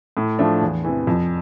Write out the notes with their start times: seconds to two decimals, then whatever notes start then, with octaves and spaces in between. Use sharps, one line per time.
0.17 A2
0.39 F3 A3 D4
0.62 E2
0.84 C3 E3
1.07 F2